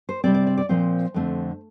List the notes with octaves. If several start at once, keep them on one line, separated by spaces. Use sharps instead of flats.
C5
C3 G3 C4 D5
D5
D5
D5
A#2 F3 C4 C5
F2 D3 A3 C4